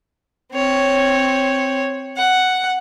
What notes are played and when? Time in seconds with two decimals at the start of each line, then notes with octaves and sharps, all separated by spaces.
0.52 C4 C#5
2.17 F#5